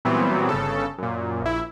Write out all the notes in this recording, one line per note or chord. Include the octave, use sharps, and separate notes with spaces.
A#2 E3 F#3 G3 B3 C4
G1 C#3 A4
F#2 A#2
A#1 E4